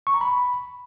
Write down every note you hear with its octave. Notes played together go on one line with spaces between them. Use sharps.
C#6
A#5
B5